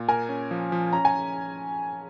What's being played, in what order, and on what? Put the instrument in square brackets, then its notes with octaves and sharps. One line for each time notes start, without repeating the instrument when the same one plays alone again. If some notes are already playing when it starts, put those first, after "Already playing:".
Already playing: [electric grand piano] A#2
[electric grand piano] A#4 [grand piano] G#5
[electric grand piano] C#4
F3
F3
[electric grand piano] C#4 [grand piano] A#5
[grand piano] G#5